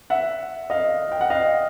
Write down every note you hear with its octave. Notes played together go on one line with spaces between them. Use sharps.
E5 F#5
D#5 F5
G5
F#5
D#5 F5